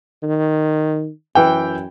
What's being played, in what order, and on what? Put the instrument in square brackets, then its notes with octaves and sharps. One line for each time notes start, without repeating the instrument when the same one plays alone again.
[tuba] D#3
[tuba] F#2 [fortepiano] E3 G5